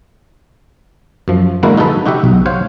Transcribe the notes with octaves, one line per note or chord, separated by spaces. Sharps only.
F#2 F3
D3 G#3 A#3 E4 F#4 A#4
D#4 F#4 G#4 A4 B4
D#4 F#4 G4 E5 F#5
B1
C5 C#5 F5 F#5